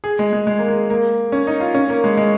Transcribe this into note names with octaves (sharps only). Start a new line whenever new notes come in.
G#4
G#3
G#3
G#3
A#3
G#3
A#3
C#4
D#4
F4
C#4
A#3
G#3
G#3